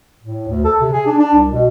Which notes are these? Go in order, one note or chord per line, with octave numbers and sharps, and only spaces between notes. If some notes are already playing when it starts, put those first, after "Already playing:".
A2
D2
A4
C3
G#4
D4
D4
C2
B2